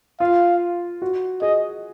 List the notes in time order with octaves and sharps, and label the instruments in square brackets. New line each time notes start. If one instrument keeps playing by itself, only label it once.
[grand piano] F4 [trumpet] F5
[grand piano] F#4
[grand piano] G#4 [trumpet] D#5